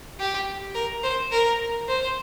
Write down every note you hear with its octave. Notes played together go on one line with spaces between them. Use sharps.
G4
A#4
C5
A#4
C5